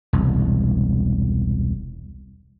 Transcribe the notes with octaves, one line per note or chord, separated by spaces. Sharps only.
E1 C2